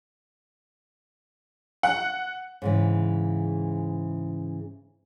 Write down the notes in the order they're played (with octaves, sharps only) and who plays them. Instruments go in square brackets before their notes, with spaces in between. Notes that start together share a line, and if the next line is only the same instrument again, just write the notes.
[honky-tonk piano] F#5
[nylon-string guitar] G#2 C#3 E3